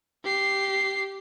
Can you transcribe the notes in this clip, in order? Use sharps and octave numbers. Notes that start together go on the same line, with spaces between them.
G4 C7